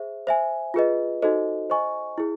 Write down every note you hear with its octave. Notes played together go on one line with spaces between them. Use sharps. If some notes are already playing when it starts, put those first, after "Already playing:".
Already playing: G#4 C5 E5
C5 E5 G#5
F4 G#4 B4 D#5
D#4 F#4 A4 C5 D#5
C5 D#5 G#5 C#6
E4 G#4